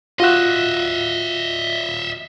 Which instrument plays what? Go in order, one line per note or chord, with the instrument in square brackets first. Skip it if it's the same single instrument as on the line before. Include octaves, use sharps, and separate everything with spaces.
[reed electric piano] F4 F#4 F#6 [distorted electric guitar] D#5 E5